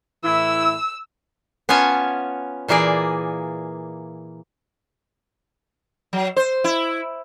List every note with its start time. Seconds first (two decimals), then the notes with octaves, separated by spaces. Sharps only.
0.24 A2 E3 E4 E6
1.69 B3 C#4 F4 C#5 G#5 A5
2.68 A#2 E3 A#3 G#4 D5
6.13 F#3
6.36 C5
6.64 E4